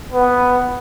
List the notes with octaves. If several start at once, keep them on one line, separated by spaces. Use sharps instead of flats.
B3